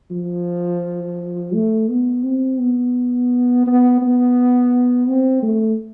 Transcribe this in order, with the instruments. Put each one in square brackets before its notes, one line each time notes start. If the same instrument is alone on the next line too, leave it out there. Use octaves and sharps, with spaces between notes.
[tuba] F3
A3
B3
C4
B3
B3
B3
C4
A3